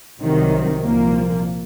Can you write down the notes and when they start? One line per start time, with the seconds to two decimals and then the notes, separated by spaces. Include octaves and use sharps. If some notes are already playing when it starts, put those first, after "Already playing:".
0.21 C2 C3 D#3 F#3
0.83 C2 A#2 F3 A#3